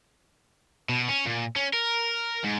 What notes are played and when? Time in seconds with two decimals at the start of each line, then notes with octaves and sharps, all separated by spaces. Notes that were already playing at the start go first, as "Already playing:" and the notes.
0.89 B2
1.09 C#4
1.26 A#2
1.56 C#4
1.73 A#4
2.44 G#2